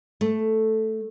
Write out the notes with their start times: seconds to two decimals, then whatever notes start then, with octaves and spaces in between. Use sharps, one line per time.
0.21 A3